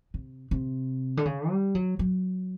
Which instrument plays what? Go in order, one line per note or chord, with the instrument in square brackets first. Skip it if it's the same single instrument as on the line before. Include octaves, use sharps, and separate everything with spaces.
[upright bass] C3
C3
D3
C#3
G3
F#3
F#3